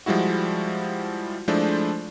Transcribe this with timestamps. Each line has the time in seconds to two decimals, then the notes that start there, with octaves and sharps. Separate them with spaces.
0.06 F3 G3 G#3 E4 F#4
1.48 F3 G#3 A3 D4 E4 C5